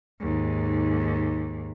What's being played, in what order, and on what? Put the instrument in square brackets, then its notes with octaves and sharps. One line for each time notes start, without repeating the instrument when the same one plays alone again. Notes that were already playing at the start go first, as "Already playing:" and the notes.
[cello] D#2 G#2